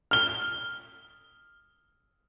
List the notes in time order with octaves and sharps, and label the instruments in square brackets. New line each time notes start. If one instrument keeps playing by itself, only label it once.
[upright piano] F6 G7